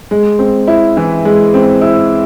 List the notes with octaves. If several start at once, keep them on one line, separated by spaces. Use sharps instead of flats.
G#3
C4
E4
E3
G#3
C4
E4